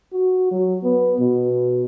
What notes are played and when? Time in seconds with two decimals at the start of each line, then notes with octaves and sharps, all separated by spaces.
0.13 F#4
0.51 F#3
0.83 B3
1.20 B2